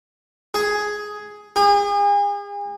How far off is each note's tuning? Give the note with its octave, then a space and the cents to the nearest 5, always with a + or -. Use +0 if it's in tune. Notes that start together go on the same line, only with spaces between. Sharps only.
G#4 +5
G#4 -40